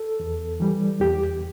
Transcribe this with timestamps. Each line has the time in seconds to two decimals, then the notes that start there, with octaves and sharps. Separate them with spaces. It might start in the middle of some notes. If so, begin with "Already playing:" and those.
Already playing: A4
0.20 E2
0.60 E3 G3
1.00 E2 G4